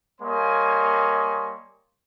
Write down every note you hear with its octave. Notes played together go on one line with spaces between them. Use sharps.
G3 A#3 C#5 D#5 G#5 C6